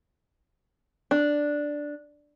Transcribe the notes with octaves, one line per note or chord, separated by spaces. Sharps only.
D4